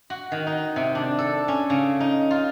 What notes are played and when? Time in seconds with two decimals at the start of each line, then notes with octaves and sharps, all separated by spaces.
0.10 F#4
0.32 D#3
0.47 D#4
0.76 C3
0.95 D4
1.19 A4
1.48 C#4
1.70 C#3
2.00 D#4
2.31 F4